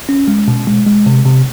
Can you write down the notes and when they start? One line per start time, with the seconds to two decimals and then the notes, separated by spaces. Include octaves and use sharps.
0.09 C#4
0.28 G#3
0.48 B2
0.67 G#3
0.87 G#3
1.06 C3
1.25 C3